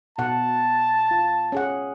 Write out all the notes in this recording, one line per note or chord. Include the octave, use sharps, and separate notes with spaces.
B2 F#5 A5
F4
C#4 G#4 F#5